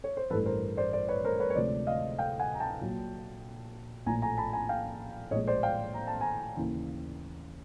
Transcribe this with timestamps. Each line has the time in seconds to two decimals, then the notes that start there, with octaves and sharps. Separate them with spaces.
0.04 C#5
0.17 C5
0.30 A1 G2 E3 G3 A4 B4
0.46 A#4 C5
0.77 C5 D5
0.93 C5 D5
1.08 B4 C#5
1.24 A#4 C5
1.40 B4 C#5
1.50 C#5
1.56 D2 C3 F3 G#3 C5 D5
1.87 D#5 F5
2.18 F5 G5
2.39 F#5 G#5
2.55 A#5
2.60 G5 A5
2.81 A#1 A#2 F#3
4.06 A#1 A2 F3 G#5 A#5
4.22 G#5 A#5
4.38 A5 B5
4.53 G#5 A#5
4.69 F5 G5
5.31 A#1 A2 F3 G#3 C#5 D#5
5.47 C5 D5
5.63 F5 G5
5.94 A#5
6.07 A5
6.21 G#5 A#5
6.57 D#2 C#3 E3